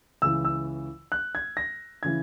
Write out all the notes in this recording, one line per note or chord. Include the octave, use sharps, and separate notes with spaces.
C#2 C#3 E3 E6
E6
F#6
G#6
A#6
C#3 E3 G#6